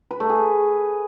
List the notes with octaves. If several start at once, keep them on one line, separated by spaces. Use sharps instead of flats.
B4
A3
G#4